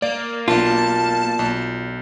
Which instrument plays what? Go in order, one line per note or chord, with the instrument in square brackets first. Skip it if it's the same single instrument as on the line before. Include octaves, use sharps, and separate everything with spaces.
[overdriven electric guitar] A#3 [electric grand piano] D5
[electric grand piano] B1 [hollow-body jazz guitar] D4 F4 [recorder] A5
[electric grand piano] B1